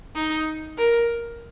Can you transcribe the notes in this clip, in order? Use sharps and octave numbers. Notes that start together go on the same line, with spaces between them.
D#4
A#4